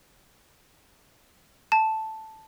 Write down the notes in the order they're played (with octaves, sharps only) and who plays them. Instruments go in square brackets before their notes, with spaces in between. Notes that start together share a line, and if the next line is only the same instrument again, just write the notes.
[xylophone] A5